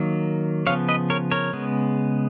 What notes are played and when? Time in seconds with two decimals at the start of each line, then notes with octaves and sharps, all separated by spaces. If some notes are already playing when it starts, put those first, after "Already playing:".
Already playing: D#3 F#3 A#3
0.67 C#3 F3 B3 C#5 F5
0.88 B4 D#5
1.10 A#4 C#5
1.31 A#4 C#5
1.53 C#3 G#3 B3